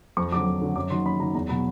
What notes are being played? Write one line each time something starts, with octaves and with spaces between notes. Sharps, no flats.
F2 C#6
D3 F#3 D6
F2
D3 F#3
F#2 D6
D#3 F#3 C6
F#2 B5
D#3 F#3 A#5
E2 A#5
B2 F#3 B5